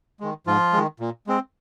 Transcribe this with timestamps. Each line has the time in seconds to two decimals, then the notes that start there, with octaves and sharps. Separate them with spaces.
0.20 D#3 G#3
0.47 G#2 F3 F4
0.73 D#3 G#3
1.00 A#2
1.27 G#3 C4